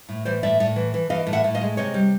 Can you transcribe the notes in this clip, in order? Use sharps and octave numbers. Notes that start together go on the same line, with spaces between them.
A2
E3 C5 D5
A2 D5 E5
A2
E3
E3
E3 D#5 F5
A2
E5 F#5
A2
D#5 F5
G#3
C3 C#5 D#5
G3